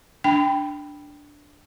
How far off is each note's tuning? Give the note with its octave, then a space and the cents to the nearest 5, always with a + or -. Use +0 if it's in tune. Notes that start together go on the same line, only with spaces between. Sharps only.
D4 +0 G5 +0 B5 +0